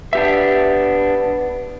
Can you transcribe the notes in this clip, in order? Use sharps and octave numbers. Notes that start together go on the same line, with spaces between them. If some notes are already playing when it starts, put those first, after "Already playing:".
B3 D4 G4 E5